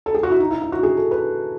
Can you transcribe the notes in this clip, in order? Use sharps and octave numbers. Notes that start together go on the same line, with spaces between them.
A4
G#4
F#4
E4
D#4
E4
E4
F#4
G#4
A4
B4